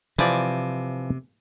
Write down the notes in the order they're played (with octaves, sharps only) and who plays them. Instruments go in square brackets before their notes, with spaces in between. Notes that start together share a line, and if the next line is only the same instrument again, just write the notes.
[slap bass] C3 [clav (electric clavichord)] E3 F3 D5